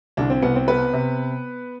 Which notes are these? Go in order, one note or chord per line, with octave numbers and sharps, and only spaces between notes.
C2 D3 D4
C4
C2 B3
C4
C3 B3 B4
C3